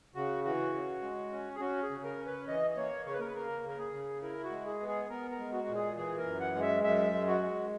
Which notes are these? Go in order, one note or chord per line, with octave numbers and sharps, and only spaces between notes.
C#3 F#4
E3 F#4
C#3
G#3
C#4
G#4
C#4 F#4
G#4
C#3
A#4
C#4
B4
E3 D#5
D#5
A#3 C#5
C#3 C#5
B4
A#4
B4
A#3 A#4
C#3 A#4
G#4
C#3
E4 A#4
F#4
G#3
G#4
B3
G#4
B3 A#4
A#4
G#3
F#4
A#2
G#4
E3 G#4
A#4
F#2
F#5
G#3
E5
F#2 E5
G#3
F#4
G#3